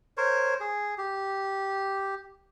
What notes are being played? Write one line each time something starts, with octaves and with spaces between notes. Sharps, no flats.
A#4 C5 C#5
G#4
G4